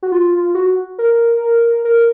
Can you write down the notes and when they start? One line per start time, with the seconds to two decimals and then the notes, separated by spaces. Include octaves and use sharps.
0.03 F#4
0.12 F4
0.55 F#4
0.98 A#4
1.85 A#4